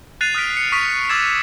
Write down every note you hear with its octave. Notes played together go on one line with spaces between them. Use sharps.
F#6 A6 C7 D#7 F7
D#6 F6 F#6 A6 B6 D7
C#7
C#6 D#6 B6 D7 D#7 F7
C#6 D6 E6 G#6 A6 E7